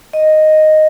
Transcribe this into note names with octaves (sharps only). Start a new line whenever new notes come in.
D#5